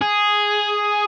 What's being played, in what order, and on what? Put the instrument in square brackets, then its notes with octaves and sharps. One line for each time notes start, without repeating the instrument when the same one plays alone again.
[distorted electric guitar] G#4